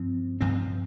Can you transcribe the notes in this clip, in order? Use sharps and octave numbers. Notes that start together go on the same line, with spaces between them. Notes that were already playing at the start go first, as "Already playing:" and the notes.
Already playing: G2 F3 C4
G2 F3 C4